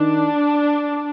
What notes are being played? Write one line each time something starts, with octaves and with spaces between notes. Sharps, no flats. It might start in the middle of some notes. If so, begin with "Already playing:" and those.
Already playing: D#3 D4